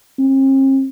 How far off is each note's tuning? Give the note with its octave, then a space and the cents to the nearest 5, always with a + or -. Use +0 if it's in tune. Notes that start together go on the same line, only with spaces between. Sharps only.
C4 +45